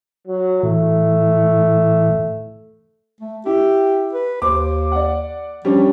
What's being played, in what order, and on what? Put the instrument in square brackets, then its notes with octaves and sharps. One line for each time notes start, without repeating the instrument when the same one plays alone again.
[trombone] F#3
[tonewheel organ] A2 E3 [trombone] A3
[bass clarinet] A3
[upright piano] E4 [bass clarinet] G4
[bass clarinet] B4
[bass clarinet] D#2 [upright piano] C5 D6
[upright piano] D5 F#5
[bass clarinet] F3 [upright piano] G3 C#4 D4